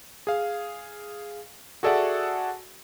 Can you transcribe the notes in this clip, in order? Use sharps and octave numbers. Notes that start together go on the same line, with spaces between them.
G#4 F5
F#4 G#4 A4 D5 E5 F#5